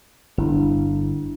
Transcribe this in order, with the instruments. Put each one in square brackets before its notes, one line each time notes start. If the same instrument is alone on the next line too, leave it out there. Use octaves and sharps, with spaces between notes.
[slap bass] G1 [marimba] D4 E4